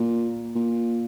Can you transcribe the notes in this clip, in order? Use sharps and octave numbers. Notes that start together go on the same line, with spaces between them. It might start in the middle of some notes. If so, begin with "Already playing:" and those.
Already playing: A#2
A#2